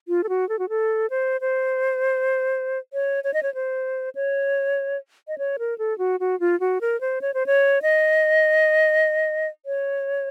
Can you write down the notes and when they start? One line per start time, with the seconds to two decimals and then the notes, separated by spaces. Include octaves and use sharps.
0.08 F4
0.23 A4
0.29 F#4
0.49 A4
0.59 F#4
0.69 A4
1.10 C5
1.41 C5
2.93 C#5
3.24 C#5
3.34 D#5
3.43 C#5
3.54 C5
4.15 C#5
5.28 D#5
5.38 C#5
5.59 A#4
5.78 A4
5.98 F#4
6.20 F#4
6.40 F4
6.60 F#4
6.81 A#4
7.01 C5
7.21 C#5
7.34 C5
7.46 C#5
7.82 D#5
9.66 C#5